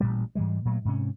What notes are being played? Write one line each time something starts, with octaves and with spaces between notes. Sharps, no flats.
A1 A#2 G3
G#2 E3 G3 G#3
A#2 F#3 A3
G#2 C3 C#4